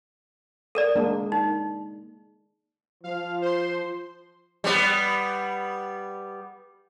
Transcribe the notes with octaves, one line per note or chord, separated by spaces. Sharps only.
A4 A#4 D5
G#3 A#3 D4
D#4
F3 F5
C5 C6
G3 B3